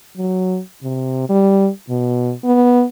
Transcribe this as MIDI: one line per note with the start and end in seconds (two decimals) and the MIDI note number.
0.17 0.59 54
0.83 1.25 48
1.29 1.70 55
1.89 2.33 47
2.44 2.84 59